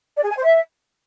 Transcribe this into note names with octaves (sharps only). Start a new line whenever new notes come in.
D5
G#4
G#5
C5
E5